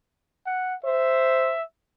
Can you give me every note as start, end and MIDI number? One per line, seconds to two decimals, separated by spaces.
0.47 0.75 78
0.84 1.54 72
0.84 1.62 76